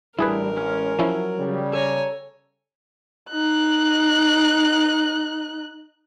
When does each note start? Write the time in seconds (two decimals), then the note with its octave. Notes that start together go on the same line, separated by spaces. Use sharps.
0.19 A1 G3 D4 E4 G#4 A#4 B4
0.56 G#3 C#4 F6
0.99 F3 F#3 C#4 E4
1.39 C#3 G3
1.73 A4 C#5 G#5 A#5
3.30 D#4 F#6